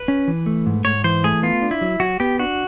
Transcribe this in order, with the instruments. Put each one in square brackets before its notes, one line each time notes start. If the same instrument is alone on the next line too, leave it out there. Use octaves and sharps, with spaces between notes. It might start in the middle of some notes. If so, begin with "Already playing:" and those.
Already playing: [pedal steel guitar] B4
[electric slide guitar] C#4
E3
A3
G#2
[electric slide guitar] G#2 [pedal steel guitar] C#5
[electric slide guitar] E3 [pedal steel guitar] C5
[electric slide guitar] A3 [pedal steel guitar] G#4
[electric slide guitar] B3 [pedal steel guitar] F4
[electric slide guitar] D4
[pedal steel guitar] E4
[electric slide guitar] F#3
[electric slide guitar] F#3 [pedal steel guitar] F#4
[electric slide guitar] B3 [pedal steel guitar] G4
[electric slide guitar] D4 [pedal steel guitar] F#4